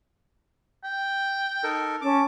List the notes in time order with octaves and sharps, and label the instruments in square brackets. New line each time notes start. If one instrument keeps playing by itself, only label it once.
[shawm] G5
[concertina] D#4 A4 A#4
[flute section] C#4 A5 [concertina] D6